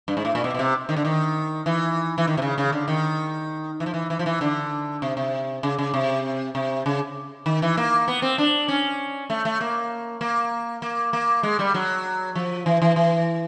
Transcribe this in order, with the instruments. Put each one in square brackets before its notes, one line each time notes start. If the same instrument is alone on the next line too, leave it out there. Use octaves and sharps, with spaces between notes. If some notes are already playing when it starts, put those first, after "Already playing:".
[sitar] G2
G#2
A2
A#2
B2
B2
C3
D#3
D3
D#3
E3
E3
D#3
C3
C#3
C#3
D3
D#3
E3
F3
E3
E3
F3
E3
D3
C3
C3
C#3
C#3
C3
C3
C#3
D#3
E3
A#3
B3
C4
D4
C#4
A3
A3
A#3
A#3
A#3
A#3
G#3
G3
F#3
F3
E3
E3
E3